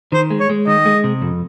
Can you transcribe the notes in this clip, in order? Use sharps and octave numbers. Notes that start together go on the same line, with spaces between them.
D#3 C5
G#3
C#5
G#3
D#3 D#5
G#3
C3
F2